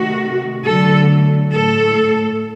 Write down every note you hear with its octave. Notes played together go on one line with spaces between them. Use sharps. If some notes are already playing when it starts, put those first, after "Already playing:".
Already playing: C3 D#3 A3 F#4
D3 F#3 A3 A4
A2 A3 A4